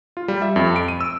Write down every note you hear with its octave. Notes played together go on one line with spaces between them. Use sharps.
F4
G3
E5
F2
D7
D#7
E6